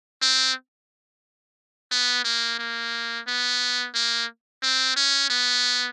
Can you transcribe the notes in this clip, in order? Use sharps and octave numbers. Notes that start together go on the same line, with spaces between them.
C4
B3
A#3
A#3
B3
A#3
C4
C#4
B3